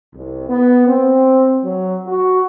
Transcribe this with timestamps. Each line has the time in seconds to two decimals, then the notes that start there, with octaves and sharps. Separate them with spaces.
0.14 C2
0.48 B3
0.86 C4
1.63 F#3
2.06 F#4